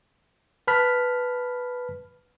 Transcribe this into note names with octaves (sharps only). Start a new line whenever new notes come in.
B4 A5 B5 F6 B6